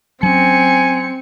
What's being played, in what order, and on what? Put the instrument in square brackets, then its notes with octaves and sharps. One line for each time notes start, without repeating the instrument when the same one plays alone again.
[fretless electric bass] F#3 C#4 [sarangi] C4 [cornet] G#5 [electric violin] C#7